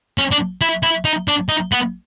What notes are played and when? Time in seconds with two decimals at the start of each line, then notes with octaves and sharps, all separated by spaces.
0.18 C#4
0.31 D4
0.61 E4
0.83 E4
1.05 D#4
1.28 D4
1.49 D#4
1.72 B3